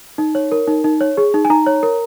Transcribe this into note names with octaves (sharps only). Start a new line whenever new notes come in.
D#4
C#5
A#4
D#4
D#4
C#5
G#4
D#4
G#5
D#4 A#5
C#5
A#4